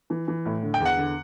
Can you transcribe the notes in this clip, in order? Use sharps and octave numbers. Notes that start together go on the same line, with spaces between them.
E3
E3
A2
D3
G5
E2
F#5
D3